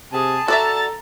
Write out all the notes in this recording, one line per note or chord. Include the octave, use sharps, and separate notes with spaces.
C3 G#4 A5
F#4 A4 D5 E5 A#5 A6